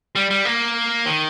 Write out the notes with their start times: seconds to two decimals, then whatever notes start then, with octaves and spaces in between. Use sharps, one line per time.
0.15 G3
0.30 G3
0.45 A#3
1.06 D#3